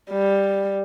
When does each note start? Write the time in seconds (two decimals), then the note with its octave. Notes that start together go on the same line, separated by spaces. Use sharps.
0.10 G3